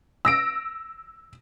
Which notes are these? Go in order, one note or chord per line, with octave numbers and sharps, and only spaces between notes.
E6 A#6 D7